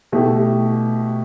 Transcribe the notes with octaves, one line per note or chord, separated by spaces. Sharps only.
B2 A3 E4 G4